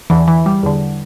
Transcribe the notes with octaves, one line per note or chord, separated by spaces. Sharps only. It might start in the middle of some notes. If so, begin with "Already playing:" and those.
E2 D3 E3
E3
G3
E2 D3